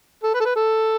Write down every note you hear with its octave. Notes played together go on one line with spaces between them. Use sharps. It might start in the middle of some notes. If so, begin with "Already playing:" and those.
A4
B4
A4
B4
A4